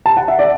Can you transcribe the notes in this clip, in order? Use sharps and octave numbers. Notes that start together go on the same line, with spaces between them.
A5
F#5
E5
D5